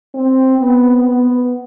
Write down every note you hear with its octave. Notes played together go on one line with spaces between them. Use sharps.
C4
B3
B3